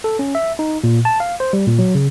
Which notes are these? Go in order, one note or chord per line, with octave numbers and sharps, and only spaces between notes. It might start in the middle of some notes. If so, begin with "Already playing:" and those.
A4
C#4
E5
D#4
A#2
A5
F5
C5
G3
A#2
F#3
C#3